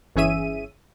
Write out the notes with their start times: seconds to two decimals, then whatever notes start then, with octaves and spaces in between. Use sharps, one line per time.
0.16 G1 E3 C#4 G#4 E5 D#7